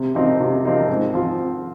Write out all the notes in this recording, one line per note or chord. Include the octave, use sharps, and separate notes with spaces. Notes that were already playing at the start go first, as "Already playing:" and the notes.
Already playing: C3
F3 C4 D#4
C3
F3 C4 D#4
G#2
F3 C4 F4